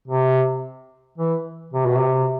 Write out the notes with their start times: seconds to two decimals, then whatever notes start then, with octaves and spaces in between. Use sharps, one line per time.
0.08 C3
1.18 E3
1.73 C3
1.86 B2
1.99 C3